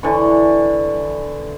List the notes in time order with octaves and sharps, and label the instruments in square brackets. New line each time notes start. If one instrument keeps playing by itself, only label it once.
[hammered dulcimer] D3 E3 C#6